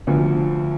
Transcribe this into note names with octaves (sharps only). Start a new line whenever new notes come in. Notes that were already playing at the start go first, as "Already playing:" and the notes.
D2 D3 F3